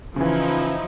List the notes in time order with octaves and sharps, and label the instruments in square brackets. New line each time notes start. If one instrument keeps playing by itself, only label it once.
[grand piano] C#3 E3 [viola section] F3 D#4 E4